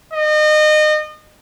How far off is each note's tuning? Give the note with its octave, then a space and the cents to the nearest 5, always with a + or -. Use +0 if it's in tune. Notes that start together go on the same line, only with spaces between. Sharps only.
D#5 -30